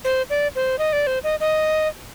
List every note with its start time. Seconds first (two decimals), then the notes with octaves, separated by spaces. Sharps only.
0.04 C5
0.30 D5
0.56 C5
0.79 D#5
0.93 D5
1.07 C5
1.24 D#5
1.40 D#5